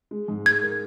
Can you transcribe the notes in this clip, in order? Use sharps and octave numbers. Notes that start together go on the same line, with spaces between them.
G#3
G#2
G#3 G#6
A#4